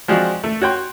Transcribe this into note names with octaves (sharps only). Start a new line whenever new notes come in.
F3 G#3 C4 D4 F#4
A3
F#4 C#5 G5 C6